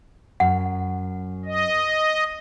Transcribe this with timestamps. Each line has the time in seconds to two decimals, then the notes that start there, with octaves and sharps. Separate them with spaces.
0.40 F#2 F#5
1.46 D#5